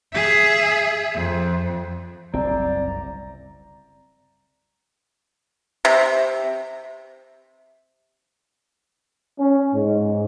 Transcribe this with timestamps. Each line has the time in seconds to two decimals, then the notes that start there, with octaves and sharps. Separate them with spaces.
0.13 G#4 E5
1.15 F2
2.34 F#1 C2 C4 D5 A#5
5.85 C3
9.39 C#4
9.75 G#2